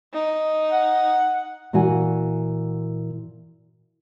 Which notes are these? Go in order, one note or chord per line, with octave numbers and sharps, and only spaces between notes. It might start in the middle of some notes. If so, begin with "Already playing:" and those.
D#4
F#5
A#2 E3 F#4 F#5 G#5